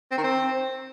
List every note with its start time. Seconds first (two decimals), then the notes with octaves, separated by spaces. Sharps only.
0.12 C4
0.18 D#3
0.24 C4